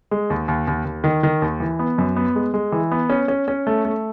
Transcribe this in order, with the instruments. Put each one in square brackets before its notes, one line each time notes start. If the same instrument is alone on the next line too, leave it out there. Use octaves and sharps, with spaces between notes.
[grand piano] G#3
D#2
D#2
D#2
D#2
D#3
D#3
D#2
E3
B3
F#2
B3
G#3
G#3
E3
B3
C#4
C#4
C#4
A3
A3